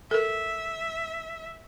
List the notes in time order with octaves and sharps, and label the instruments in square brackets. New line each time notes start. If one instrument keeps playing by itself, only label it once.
[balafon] A4 A#4 [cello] E5